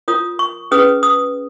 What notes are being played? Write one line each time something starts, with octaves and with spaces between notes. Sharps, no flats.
F4 A#4 C#5 D#6
C#6
C#4 G#4 B4 D#6
D#6